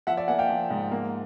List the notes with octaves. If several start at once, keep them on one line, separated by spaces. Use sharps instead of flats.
F3 E5 F#5
D5 E5
A#3 F#5 G#5
F5 G5
F3
G#2
A#3